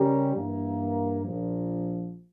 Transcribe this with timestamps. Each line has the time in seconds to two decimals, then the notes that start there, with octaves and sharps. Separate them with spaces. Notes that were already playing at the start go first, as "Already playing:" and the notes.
Already playing: C#3 G3 C#4 G4 A#4
0.35 G2 E3 A#3
1.24 A#1 A#2 F3